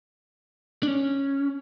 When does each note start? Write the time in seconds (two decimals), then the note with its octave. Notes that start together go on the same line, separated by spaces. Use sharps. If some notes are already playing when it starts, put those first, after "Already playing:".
0.83 D4
0.88 C#4